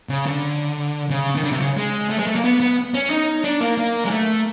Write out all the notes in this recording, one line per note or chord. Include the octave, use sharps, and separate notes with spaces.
C#3
D3
C#3
D#3
D3
C3
C#3
G#3
A3
G#3
A3
A#3
B3
B3
C#4
D#4
D4
A#3
A#3
G#3
A3